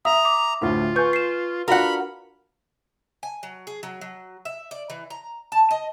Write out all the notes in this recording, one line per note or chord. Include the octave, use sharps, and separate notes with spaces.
E5 A#5 D#6
D6
D2 A2 F4
B4 G#5 C#6 G6
C7 E7
D4 F4 F#4 A#4 F#5 B5
G#5
F#3
G#4
F#3
F#3
E5
D5
E3
A#5
A5
D#5